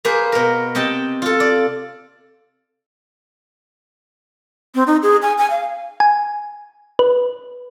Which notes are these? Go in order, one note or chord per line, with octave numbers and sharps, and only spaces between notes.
A#3 G#4 B4 C5
B2 A#4
C3 D#5 G5 A5
F4 A4
D5
C4
D#4
G#4
G#5
G#5
F5
G#5
B4